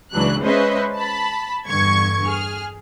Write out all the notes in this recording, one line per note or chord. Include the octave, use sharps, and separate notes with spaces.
C#2 E3 F#3 D4 F#6
G#3 C#4 B4 C5 D#5 E5
A5 B5
E2 G2 D3 C#6 G#6
G#4 F6